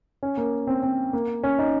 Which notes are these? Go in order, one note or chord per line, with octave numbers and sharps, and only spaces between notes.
C#4
A#3
C4
C4
A#3
C#4
D#4